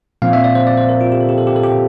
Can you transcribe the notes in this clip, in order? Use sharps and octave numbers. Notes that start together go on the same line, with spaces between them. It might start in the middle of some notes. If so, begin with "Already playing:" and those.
A#2 F3 C4 F5
E5
D5
C5
D5
C5
A#4
F4
G4
A4
G4
A4
G4
A4
G4